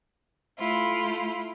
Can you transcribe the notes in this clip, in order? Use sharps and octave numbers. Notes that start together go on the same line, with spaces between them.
A3 E4 F4